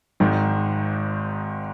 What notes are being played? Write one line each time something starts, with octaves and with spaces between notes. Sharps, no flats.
G#1 G#2 D#3